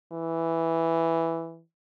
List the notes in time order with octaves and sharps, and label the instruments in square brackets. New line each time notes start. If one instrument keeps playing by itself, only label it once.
[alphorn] E3